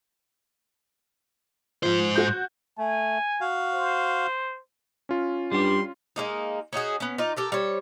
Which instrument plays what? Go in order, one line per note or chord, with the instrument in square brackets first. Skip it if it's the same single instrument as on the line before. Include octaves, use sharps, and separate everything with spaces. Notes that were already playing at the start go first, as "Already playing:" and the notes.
[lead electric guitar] G#2 C5 [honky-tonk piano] F3
[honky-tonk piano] F#4 G6
[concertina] A3 [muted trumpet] G#5
[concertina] F#4 F5
[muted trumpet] C5
[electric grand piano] C#4 F4
[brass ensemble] G2 [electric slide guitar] G3 G4 [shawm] C6
[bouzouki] G#3 A#3 D#4
C#4 D#4 F#4 G#4
B3 C#4
D#4 F4 D5
G4 A4 A#4
G3 C5 C#5